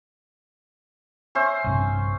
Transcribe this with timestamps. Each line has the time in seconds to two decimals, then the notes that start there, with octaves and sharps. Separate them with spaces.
1.35 C#4 C5 E5
1.64 A#1 G2 C3